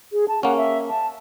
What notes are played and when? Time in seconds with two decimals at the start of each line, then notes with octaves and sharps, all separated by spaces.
0.13 G#4
0.28 A5
0.43 A#3 C#4 F#5
0.57 E5
0.89 A5